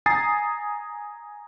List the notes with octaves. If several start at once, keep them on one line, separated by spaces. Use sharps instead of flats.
G#5 A#5 D#6 A6 C7